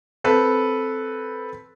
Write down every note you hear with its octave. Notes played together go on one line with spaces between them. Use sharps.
C4 A4 B4